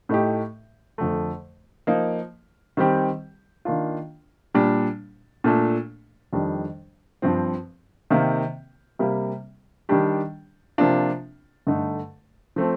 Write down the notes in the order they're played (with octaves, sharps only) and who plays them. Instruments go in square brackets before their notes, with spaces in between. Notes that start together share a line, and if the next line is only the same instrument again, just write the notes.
[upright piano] A2 A3 D#4 G4
F2 D3 A3
F3 A#3 D#4
D#3 G3 C4 G4
D#3 A#3 D4 F4
A#2 G3 D4
A#2 A3 D4
F2 D#3 G3 D4
G2 F3 C4
C3 D#3 A#3
C3 G3 A#3
D#3 G3 D4 G4
C3 F3 A#3 D4 F4
G2 D3 A3 D#4
F3 A3 C4